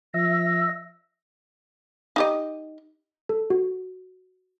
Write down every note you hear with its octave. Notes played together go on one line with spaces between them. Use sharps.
F3 E5 A#6
D#4 G4 D#5
A4
F#4